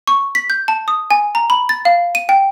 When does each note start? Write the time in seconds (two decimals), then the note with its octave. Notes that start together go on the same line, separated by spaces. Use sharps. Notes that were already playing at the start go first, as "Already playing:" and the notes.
0.07 C#6
0.35 B6
0.50 G6
0.68 A5
0.88 D#6
1.11 G#5
1.35 A#5
1.50 B5
1.69 A6
1.85 F5
2.15 D#7
2.29 G5